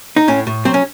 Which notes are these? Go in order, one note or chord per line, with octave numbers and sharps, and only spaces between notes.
D#4
A2 C#4
A2
F#3 C4
C#4